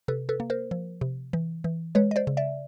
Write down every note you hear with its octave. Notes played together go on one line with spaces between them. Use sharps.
C3 A4 B4
A4 B4
A#3
A#4 C5
F3
C3
E3
E3
G#3 B4 C#5
D#5
C5 D5
C#3
D5 E5